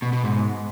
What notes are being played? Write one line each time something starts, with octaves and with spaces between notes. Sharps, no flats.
B2
B2
G#2